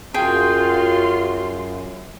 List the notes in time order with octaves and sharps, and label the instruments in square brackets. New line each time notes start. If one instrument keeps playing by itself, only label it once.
[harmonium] F#2 [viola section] F4 F#4 C6 [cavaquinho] G#4 G5